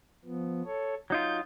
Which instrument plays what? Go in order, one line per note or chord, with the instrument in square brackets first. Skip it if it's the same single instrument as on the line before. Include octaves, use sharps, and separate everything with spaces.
[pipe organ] F3 B3
A4 C#5
[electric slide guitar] F#3 D#4 F4 [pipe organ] G6